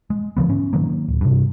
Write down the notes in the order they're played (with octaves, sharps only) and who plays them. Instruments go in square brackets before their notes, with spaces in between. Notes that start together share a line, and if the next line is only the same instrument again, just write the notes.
[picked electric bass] G#3
D3 F3 B3
G#2 C#4
D#3 F#3 A#3
D1
G2 C3